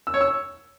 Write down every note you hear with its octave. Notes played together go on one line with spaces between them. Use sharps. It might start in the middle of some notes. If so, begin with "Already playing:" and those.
E6
C#5
E6